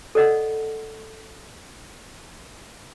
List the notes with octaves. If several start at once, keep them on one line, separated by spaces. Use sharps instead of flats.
A4 D5 D#5 F#5